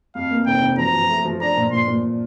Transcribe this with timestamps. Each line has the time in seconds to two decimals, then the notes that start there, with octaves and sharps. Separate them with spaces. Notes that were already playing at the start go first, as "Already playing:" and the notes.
0.15 F2 F5
0.31 A#3
0.46 F1 G5
0.62 F1
0.78 F3 A#5
0.94 F3
1.09 A3
1.25 F3
1.41 D4 A#5
1.57 A#2
1.72 A#2 C6
1.87 A#2